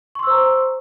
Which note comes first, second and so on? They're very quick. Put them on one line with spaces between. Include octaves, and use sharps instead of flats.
C#6 C6 E6 C5 A#5